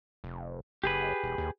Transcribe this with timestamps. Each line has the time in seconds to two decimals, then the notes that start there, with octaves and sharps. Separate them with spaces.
0.24 F1
0.84 F#1 G4 G#4 B4
1.24 E1
1.38 D#2